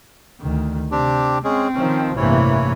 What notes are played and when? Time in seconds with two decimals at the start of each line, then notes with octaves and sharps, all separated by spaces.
0.40 D2 D#3
0.91 C3 C4 D4 G4
1.44 G#3 C4 C#4 G#4
1.74 D#3 F3 C#4
2.17 A1 G2 C3 E3 A#3 E4 C#5